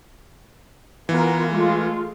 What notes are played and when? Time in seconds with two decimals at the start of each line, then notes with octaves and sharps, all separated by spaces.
1.09 E3 B3 F4 A#4
1.50 G#3 A3 F4